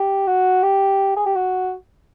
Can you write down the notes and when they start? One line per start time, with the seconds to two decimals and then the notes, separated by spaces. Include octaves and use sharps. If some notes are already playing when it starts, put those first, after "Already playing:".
Already playing: G4
0.27 F#4
0.63 G4
1.17 G#4
1.26 G4
1.35 F#4